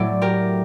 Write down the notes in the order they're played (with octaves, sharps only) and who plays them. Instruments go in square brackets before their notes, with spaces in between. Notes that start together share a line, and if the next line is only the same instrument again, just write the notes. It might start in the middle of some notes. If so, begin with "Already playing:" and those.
Already playing: [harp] A2 F#3 A3 D5
G4 A#4